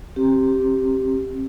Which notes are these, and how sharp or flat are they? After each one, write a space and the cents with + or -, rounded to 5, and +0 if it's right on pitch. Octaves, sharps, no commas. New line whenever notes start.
C4 +30 G4 -5